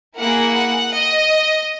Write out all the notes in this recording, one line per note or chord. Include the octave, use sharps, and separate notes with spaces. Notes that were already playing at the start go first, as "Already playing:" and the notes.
A#3 E4 G#4 F#5
D#5